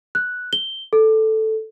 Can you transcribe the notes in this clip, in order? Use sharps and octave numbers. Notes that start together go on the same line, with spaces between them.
F#6
G7
A4